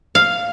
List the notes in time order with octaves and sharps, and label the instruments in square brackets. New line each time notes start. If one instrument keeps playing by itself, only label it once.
[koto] F5